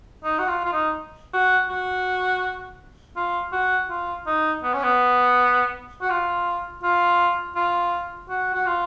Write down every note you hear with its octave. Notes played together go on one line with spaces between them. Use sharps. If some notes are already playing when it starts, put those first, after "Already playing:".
D#4
F#4
F4
F4
D#4
F#4
F#4
F4
F#4
F4
D#4
B3
C#4
B3
F#4
F4
F4
F4
F#4
F#4
F4